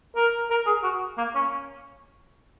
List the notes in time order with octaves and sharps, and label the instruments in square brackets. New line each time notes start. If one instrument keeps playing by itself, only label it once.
[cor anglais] A#4
A#4
G#4
F#4
A#3
C#4